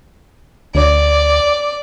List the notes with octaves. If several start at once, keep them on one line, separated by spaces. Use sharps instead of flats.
D2 D5